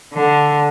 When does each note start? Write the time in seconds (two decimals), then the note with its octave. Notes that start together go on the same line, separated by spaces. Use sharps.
0.14 D3